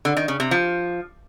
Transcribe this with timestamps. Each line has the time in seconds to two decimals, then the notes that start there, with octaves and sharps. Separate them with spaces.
0.05 D3
0.17 D#3
0.28 C#3
0.40 C3
0.51 F3